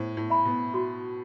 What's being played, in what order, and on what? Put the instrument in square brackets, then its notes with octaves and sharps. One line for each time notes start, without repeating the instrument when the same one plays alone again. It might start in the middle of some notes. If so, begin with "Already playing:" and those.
Already playing: [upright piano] A2 [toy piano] C5
[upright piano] A2
[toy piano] E5 B5
[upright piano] B2
[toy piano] F#4